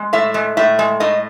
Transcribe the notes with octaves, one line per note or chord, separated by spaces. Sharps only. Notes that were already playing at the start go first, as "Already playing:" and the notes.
Already playing: G#3
A2 E5
G#3
A2 E5
G#3
A2 D#5